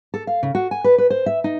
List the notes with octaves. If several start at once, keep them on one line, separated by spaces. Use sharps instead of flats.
A4
F5
C#3
F#4
G#5
B4
B4
C5
E5
D#4